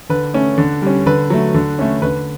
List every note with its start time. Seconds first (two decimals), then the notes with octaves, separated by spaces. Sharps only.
0.09 D3 B4
0.34 A3 C#4
0.58 D3
0.82 G3 C#4
1.06 D3 B4
1.30 F#3 A3
1.54 D3
1.79 A3 C#4
2.02 D3 B4